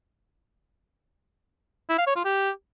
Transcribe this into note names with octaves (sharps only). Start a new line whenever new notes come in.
E4
F5
C#5
F4
G4